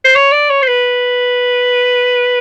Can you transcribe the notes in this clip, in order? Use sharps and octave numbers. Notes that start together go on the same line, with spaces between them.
C5
C#5
D5
C#5
C5
B4